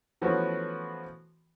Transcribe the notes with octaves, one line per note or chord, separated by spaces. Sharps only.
E3 F3 A3 B3 C#4 F#4